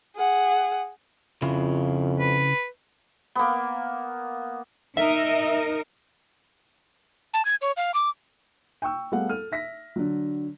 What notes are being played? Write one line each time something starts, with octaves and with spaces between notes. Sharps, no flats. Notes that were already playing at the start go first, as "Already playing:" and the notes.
G#4 F#5
F2 C#3 E4 F4
B4
A#3 B3
D#4 A#4 D#5 E5
A5
G#6
C#5
F5
D6
G5 C#6 E6
G3 A3 B3 G#4 F5 F#5
A4 F6 D#7
E5 A#6 B6
D3 F#3